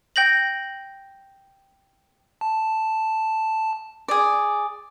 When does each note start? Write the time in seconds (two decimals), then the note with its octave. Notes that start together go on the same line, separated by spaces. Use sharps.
0.16 G5 G6 A#6 F#7
2.41 A5
4.08 G#4 D5